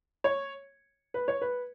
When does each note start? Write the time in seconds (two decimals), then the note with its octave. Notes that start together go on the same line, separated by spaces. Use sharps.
0.24 C#5
1.14 B4
1.28 C#5
1.42 B4